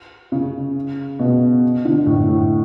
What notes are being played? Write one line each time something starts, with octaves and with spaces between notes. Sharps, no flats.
C#3
B2
D3
A2
A2